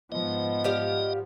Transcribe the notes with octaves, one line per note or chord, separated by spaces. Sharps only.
G#2 F3 B3 D#5
G4 D5 F5